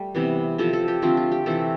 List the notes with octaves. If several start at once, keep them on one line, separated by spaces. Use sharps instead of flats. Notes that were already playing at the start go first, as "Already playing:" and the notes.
Already playing: G3 A3
C3 E3 B3
C3 F3 C4 A4
A4
G4
D3 F3 A3 C4 F4
F4
G4
C3 E3 A3 C4 A4